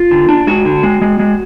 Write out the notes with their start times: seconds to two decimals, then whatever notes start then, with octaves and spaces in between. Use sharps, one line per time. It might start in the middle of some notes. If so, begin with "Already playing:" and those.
Already playing: F4
0.11 D3
0.29 D4
0.47 G#3 F#4
0.65 D3
0.83 G#3
1.02 G#3
1.19 G#3